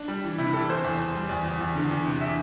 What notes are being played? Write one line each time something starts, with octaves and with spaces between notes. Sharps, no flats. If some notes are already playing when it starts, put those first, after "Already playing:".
Already playing: D4
G3
E3
C3 E4
E3 A4
E2 C5
E2
E2
G3
E2 D5
E2
E2
D3
E2
C3
E3 E5